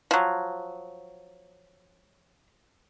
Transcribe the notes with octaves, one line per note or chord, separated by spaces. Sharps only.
F3 F#3